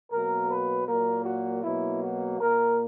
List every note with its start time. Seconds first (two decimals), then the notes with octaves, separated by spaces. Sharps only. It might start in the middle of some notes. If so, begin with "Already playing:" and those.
0.11 B2 F#3 A#3 A#4
0.49 B4
0.87 A#2 F#3 A#3 A#4
1.25 F#4
1.63 B2 F#3 A#3 E4
2.02 F#4
2.39 A#2 A#3 A#4